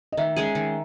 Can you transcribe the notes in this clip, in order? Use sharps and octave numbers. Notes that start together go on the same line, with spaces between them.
D#5
D#3 E5
G#3 C#4 G#4
D#3